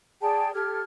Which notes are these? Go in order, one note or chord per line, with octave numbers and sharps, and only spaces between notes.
G#4 D5 G5 A5
G4 A4 F6 G#6